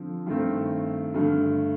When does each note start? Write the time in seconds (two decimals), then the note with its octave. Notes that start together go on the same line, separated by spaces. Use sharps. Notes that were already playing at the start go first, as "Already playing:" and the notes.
Already playing: D3 F3 C4
0.26 G2 D#3 A3 C4
1.14 G2 D3 A3